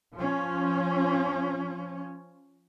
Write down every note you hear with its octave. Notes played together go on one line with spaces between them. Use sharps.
F3 C#4